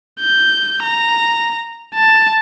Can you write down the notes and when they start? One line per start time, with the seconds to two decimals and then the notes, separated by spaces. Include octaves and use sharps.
0.20 G6
0.83 A#5
1.95 A5